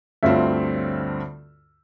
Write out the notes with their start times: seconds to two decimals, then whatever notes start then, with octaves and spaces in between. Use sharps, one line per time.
0.23 D2 G2 C4 F4 C#5 E5